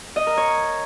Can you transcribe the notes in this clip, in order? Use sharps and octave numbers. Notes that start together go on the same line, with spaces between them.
D#5
A#4
C#5